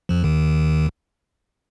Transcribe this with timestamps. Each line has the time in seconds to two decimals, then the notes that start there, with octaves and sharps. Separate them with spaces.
0.09 F2 F3
0.24 D#2 D#3